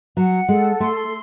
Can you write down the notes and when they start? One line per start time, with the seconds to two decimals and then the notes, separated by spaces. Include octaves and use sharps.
0.17 F#3 F#5
0.49 G#3 A4
0.80 A3 C6